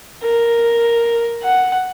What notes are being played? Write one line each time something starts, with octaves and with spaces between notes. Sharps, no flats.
A#4
F#5